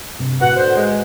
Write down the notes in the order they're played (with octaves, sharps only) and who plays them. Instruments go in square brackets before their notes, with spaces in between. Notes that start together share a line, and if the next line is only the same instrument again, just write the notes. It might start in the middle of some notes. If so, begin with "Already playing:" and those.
[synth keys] G2 C3
[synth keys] A2 F#4 B4 [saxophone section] F#5
[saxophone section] D3 C5
G#3